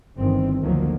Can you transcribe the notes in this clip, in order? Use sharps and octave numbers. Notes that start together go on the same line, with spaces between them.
G1 G2 D#3 E3 C4
D2 D3 D#3 F3 F#3 A#3